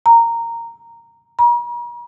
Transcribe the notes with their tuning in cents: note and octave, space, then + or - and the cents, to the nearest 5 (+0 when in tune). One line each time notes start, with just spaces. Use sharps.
A#5 -10
A#5 +45